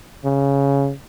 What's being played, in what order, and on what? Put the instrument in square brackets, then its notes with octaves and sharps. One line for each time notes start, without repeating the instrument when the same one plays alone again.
[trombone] C#3